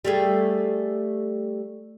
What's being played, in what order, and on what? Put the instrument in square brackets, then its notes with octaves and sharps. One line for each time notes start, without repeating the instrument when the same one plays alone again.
[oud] G3 A3 G#4